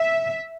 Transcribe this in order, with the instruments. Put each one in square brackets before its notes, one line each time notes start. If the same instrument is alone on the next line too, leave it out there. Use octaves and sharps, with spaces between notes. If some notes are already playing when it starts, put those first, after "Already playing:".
Already playing: [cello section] E5